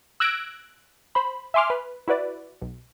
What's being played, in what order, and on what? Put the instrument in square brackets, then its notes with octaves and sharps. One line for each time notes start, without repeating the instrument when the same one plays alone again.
[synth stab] E6 F#6 G#6 A#6 D7
C5 B5
E5 G#5 C6 D6 F6
B4
E4 F#4 B4 D5
B1